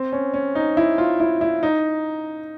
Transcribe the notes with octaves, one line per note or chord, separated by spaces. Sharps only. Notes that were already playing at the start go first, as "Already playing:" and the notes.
Already playing: C4
C#4
C#4
D#4
E4
F4
E4
E4
D#4